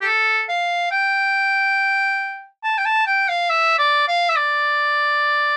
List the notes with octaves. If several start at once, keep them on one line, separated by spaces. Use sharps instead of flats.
G4
A4
F5
G5
A5
G5
A5
G5
F5
E5
D5
F5
E5
D5